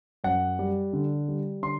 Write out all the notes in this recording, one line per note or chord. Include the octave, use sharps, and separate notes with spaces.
F#2 F#5
G3
D3
G3
D3 C6